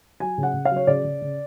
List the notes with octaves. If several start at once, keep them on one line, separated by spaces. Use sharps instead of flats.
F#3 G#5
C#3
F#5
C#3
F5
F#3
C#5
C#3 D5
C#3
C#3